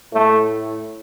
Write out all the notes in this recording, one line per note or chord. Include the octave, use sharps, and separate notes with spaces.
A2 A3